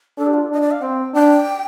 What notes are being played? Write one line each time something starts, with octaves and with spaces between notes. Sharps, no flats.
D4 A4
G4
F4
D4 D#5
D5
F5
C4 G5
D4 G5